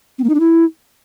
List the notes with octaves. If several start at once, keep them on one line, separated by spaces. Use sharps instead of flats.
C4
A#3
D#4
D4
E4